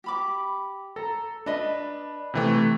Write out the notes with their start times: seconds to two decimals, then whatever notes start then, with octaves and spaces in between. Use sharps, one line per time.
0.04 G4 B5 D6
0.96 A4 A#5
1.46 D4 B4 D#5 E5
2.34 C3 E3 A3